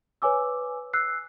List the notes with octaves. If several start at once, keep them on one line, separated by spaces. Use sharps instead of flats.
B4 C#5 G#5 D6 E6
E6 F#6 C7